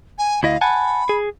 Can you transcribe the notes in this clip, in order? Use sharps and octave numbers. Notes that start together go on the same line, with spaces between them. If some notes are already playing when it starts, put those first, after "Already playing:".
G#5
D2 E4 D#5 F5
F#5 G#5 A5 B5
G#4